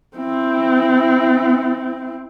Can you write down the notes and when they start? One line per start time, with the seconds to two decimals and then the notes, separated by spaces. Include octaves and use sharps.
0.17 C4 E4